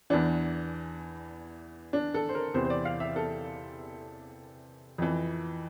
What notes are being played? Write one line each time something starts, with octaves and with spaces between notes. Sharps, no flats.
E2 E3 D4
D4
A4
C5
A#4
E2 C3 E3 C5
C5
D5
F5
E5
A4
F2 E3